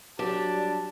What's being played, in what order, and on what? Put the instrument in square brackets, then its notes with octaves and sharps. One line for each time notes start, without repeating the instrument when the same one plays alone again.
[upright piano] F#3 [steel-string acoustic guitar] D4 [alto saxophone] G4 [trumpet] A5
[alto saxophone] G3